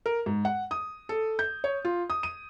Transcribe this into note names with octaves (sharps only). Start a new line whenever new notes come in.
A#4
G#2
F#5
D#6
A4
G6
C#5
F4
D#6
D#7